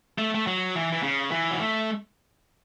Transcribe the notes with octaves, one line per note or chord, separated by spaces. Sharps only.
A3
A3
F#3
E3
E3
C#3
E3
F#3
A3